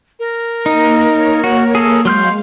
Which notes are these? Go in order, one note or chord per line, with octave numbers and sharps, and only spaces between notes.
A#4
A#3 D#4
A#3 C#5
F#4
G#4 A4
F#3 G#3 F5 C6 F6 G6